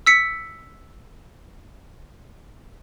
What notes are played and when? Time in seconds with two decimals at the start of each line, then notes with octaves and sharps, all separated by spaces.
0.06 E6 B6 C#7